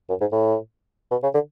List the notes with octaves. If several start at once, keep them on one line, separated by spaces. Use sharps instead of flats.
F#2
G#2
A2
B2
C#3
D3